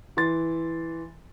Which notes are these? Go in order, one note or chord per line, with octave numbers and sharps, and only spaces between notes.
E3 C6 A6